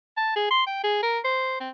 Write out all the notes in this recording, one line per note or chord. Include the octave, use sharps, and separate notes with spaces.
A5
G#4
C6
G5
G#4
A#4
C5
C4